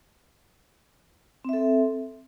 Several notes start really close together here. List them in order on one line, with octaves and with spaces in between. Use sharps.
C4 E5 A4